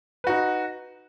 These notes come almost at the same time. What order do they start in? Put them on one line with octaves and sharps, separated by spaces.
B4 F#4 D#4